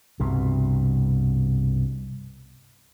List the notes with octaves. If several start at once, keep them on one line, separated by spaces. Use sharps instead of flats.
C2 G2 B2